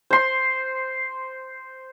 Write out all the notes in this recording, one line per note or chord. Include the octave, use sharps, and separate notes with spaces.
C5 C6